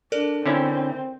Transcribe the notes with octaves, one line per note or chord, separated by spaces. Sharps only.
D4 A4 A#4 D5
D3 C4 C#4 E4